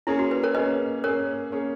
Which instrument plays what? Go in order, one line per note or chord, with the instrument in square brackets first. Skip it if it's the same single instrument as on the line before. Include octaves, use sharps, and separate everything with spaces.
[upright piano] A#3 C#4 G#4 [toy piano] E4
[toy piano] F#4
B4
A#4 C#5
[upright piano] A#3 C#4 G#4 [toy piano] B4 D#5
[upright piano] A#3 C#4 G#4 [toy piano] A#4 C#5
[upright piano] A#3 C#4 G#4